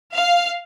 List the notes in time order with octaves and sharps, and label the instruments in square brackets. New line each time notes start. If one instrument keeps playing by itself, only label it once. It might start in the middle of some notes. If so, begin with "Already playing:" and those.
[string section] F5